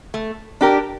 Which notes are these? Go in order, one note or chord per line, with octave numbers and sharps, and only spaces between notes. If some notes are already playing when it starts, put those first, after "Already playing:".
A3
D4 G4 A#4